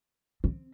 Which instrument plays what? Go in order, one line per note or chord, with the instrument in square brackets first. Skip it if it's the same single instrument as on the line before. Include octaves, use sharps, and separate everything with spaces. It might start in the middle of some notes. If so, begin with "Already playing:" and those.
[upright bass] C4